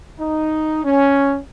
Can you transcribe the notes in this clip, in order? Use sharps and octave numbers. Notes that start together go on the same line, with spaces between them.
D#4
C#4